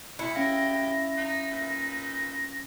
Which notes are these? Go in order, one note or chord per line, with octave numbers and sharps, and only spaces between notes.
D2 E4 C#7
D2 C#4 G4 F5 A#6
D#4
A#2 D#4 B4